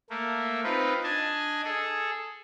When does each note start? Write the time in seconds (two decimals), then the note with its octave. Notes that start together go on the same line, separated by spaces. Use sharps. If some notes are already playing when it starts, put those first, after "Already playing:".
0.10 A3 A#3
0.64 C4 D#4 F4 B4
1.04 D4 D#5 G#5 A5
1.64 G#4 A4